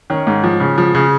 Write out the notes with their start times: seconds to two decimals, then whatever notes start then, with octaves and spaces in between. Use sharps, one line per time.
0.10 D#3 C#4
0.27 G#2
0.44 F3
0.60 C#3
0.78 F3
0.95 C#3